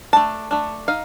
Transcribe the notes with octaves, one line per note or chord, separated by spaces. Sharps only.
A3 D4 A5
A3 D4
D#4 F5